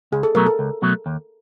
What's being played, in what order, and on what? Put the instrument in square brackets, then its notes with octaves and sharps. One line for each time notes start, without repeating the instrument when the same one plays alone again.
[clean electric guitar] C#2 [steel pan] G#4
[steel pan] A4
[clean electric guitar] B2 F#3 A3 [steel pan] A#4
[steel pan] A4
[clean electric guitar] C#2
B2 F#3 A3
D#2